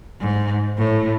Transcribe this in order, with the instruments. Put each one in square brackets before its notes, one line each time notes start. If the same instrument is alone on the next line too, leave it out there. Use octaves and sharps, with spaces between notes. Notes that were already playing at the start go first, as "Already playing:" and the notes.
[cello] G#2
A2